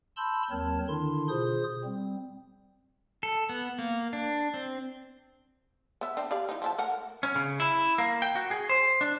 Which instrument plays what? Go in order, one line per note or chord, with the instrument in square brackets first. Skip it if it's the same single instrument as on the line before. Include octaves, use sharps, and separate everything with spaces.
[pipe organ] A5 B5 C6 E6 G6
D#2 F#3 C4 A#4 C#5 A5
D3 D#3 D4 E4 C6
B2 F4 G#4 C5 D#6
G3 C4
[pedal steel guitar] A4
B3
A#3
D4
C4
[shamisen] B3 E5
C4 D4
G4 D5 F5
D#4 E4
F3 E5 A5
A3 A#4 F#5
[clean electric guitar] C#4
C#3
E4
A#3
G5
F#4
G#4
C5
D4